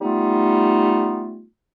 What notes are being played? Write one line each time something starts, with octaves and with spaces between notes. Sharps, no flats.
G3 A3 B3 D#4 F4